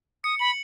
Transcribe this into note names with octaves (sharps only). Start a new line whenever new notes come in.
D#6 C#7
B5 F#7